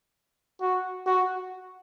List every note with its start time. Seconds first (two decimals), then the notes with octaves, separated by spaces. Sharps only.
0.61 F#4
1.06 F#4